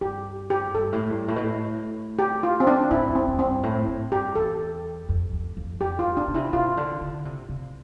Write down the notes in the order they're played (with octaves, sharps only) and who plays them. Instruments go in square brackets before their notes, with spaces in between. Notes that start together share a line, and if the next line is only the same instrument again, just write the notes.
[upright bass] G2 [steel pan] G4
[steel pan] G4
[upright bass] G2 [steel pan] A4
[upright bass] A2
G2
A2
B2
A2
[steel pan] G4
F4
C4
D4
[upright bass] A2 [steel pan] E4
[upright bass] F2
[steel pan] C4
[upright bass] F2
[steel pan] C4
[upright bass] G2
A2
A2
[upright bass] G2 [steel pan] G4
[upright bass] E2 [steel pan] A4
[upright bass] F2
F2
F2
[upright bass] F2 [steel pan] G4
[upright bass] G2 [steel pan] F4
[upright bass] B2 [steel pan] D4
[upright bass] B2
[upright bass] C3 [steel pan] E4
[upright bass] C3 [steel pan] F4
[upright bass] D3
D3
C3
C3